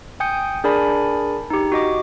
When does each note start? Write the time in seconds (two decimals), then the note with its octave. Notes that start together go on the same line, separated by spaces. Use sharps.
0.20 G5 G#5 D#6 G6 C#7
0.64 D4 G#4 A#4 D5 G#5 B5
1.50 D#4 G4
1.72 F#4 D#5 D6